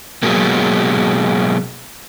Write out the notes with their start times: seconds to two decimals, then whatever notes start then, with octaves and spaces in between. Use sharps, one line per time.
0.23 B2 F#3 G#3 A#3